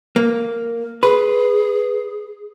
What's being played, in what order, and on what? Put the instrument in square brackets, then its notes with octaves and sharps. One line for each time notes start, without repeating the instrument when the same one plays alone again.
[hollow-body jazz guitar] A#3
[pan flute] G#4 [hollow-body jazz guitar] B4